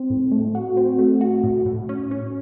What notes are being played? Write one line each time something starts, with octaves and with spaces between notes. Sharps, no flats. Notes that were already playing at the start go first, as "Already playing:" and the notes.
Already playing: C4
A2
A3
F#4
C4
A3
F#4
A2
A2
C#4
C#4